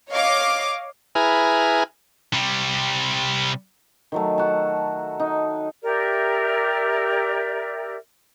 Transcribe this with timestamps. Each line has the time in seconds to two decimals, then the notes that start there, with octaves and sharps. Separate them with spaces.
0.11 C#5 D#5 F5 D6
1.15 E4 G#4 B4 G#5 A#5 F6
2.34 C3 G3
4.12 D#3 F#3 A3
4.38 F#4 A5
5.20 D#4
5.83 G4 A#4 D5 E5